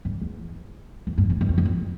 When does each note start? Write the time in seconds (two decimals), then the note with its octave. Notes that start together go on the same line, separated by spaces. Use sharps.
0.05 G2
0.21 E2
1.07 F2
1.18 G2
1.30 A2
1.41 G2
1.49 F2
1.58 G2
1.65 F2